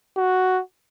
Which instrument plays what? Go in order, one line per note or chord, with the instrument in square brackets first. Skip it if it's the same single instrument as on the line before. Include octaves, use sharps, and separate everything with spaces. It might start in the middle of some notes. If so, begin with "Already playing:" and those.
[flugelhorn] F#4